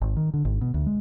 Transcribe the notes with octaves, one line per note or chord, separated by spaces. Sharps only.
G#1
D#3
D3
G#1
B2
D2
G#3